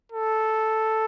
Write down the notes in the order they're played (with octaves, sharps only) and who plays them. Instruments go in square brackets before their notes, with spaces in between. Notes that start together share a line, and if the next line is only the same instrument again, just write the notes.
[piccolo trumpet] A4